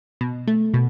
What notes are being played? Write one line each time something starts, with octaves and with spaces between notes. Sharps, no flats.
B2
A3
B2